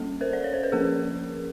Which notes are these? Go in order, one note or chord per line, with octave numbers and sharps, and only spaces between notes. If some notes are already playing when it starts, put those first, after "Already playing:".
Already playing: G3 A#3 C#4 A4
A#4 C5
D5
C#5
C5
B4
F3 A#3 C#4 G#4 A#4